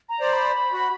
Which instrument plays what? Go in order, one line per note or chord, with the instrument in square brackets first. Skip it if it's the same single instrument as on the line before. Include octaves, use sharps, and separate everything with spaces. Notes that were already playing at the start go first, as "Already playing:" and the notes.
[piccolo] A#5
[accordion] C5 D5
[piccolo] B5
[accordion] F#4